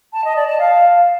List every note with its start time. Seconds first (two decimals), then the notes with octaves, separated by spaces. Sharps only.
0.13 A5
0.24 D#5
0.36 D5
0.47 A5
0.59 F5